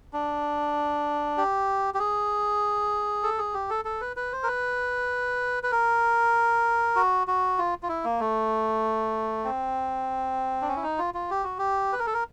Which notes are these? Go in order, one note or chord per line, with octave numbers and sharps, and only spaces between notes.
D4
G4
G4
G#4
A4
G#4
G4
A4
A4
B4
B4
C5
A#4
B4
B4
A#4
F#4
F#4
F4
F4
E4
A#3
A3
C4
D4
C#4
E4
D#4
F4
F4
G4
F#4
G4
B4
A#4
A4
A#4